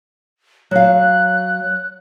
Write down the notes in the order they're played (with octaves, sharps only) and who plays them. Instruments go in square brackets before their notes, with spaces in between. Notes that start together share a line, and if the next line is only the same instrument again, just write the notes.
[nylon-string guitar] F#3 F5 [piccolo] F#6